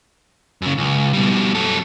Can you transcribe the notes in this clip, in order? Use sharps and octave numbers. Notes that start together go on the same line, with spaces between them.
F#2 C#3
C#2
B2 G3
F#2 A4